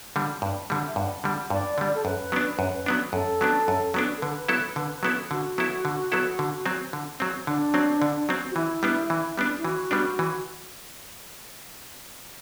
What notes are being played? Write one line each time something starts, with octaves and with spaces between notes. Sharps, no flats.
D3 G3
G2
D3 G3
E5
G2 F#5
D3 G3
G2 D5
D3 G3
A4
F#2 B4
F#3 B3 D4
F#2
F#3 B3 D4
F#2 A4
F#3 B3 D4
F#2
F#3 B3 D4
A4
D3 B4
F#3 B3 E4 A4
D3
F#3 B3 E4 A4
D3 F#4
F#3 B3 E4 A4
D3
F#3 B3 E4 A4
D3
F#3 C4
D3
F#3 C4
D3 D4
F#3 C4
D3
F#3 C4
F#4
E3 E4
G3 B3 D4
E3
G3 B3 D4
E4
E3 F#4
G3 B3 D4
E3